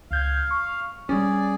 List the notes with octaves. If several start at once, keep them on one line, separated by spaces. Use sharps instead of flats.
C#2 F5 G6 G#6
C#6
G3 C#4 G#4 D5